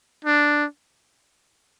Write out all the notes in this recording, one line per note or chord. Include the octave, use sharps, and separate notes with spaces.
D4